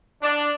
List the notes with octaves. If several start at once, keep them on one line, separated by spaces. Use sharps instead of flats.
D4